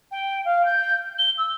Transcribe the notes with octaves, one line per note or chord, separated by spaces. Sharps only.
G5
F5
G6
G7
E6